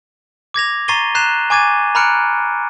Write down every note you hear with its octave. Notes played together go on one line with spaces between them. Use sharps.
D6 G#6 A#6 F7
A#5 C#6 A6 C7 D#7 G7
A#5 F#6 G6 C7 E7 F7
G#5 C#6 D6 G#6 A6 D#7
A#5 B5 F6 F#6 C#7 D7